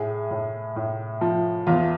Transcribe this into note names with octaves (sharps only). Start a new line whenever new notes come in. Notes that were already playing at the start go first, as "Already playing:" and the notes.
Already playing: A2 G#4
A2
A2
F3
E2 F4